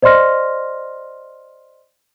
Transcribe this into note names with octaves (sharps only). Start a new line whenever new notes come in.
C5 D5 D#5 C6 F6 A#6